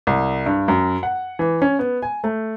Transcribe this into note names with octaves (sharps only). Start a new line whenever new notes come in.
C2
G2
F#2
F#5
E3
C#4
B3
G#5
A3